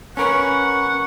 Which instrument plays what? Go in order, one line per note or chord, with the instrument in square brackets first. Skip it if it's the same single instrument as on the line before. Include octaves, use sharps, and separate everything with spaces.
[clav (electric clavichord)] C#4 A#4 B4 [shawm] F#5 [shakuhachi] C#6
[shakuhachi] C#6